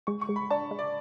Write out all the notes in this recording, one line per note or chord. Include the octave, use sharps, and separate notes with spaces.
G#3 C#6
C#6
G#3
B5
D4 A5
G#3
D5